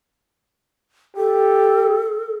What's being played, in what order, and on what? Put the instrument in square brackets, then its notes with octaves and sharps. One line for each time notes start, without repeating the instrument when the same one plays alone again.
[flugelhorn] G4 [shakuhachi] A4